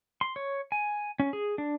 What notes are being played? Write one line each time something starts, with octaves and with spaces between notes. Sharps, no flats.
C6
C#5
G#5
C#4
G#4
D4